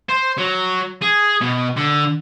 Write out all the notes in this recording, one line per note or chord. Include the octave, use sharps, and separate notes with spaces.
C5
F#3
G#4
B2
D3